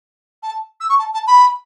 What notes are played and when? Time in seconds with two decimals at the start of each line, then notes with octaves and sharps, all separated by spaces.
0.43 A5
0.81 E6
0.89 C#6
0.99 A5
1.14 A5
1.27 B5